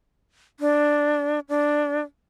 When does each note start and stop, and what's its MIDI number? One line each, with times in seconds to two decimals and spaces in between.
0.60 1.39 62
1.49 2.01 62